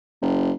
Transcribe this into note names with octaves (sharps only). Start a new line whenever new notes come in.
F#1